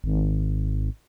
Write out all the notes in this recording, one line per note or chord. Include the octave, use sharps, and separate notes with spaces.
G#1